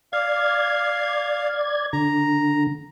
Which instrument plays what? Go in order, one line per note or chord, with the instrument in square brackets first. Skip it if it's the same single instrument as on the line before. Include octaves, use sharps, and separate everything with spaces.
[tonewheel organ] D5 G#6 [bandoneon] F5
[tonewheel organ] D3 [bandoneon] A#5